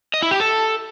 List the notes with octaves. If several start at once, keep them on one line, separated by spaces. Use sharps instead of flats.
D#5
E4
G4
A4